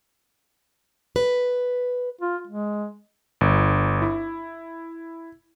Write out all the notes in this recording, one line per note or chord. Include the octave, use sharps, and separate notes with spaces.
B4
F4
G#3
G1
E4